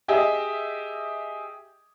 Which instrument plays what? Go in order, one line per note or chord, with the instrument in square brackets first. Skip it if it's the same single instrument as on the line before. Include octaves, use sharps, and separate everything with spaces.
[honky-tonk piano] G4 G#4 D#5 E5